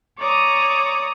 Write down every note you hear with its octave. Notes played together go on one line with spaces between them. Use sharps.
C#5 D5 A#5 D#6